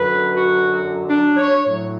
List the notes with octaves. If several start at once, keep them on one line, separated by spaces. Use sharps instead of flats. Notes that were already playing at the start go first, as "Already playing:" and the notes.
Already playing: F#2 D3 F#3 B4
F#4
D4
C#5
A2 F#3